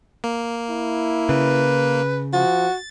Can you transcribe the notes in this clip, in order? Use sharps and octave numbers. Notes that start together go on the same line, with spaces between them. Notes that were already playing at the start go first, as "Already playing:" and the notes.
A#3
E4
C#3 B4
F3 F#4 A6